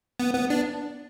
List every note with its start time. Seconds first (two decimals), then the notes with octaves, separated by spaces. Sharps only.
0.20 B3
0.34 B3
0.50 D4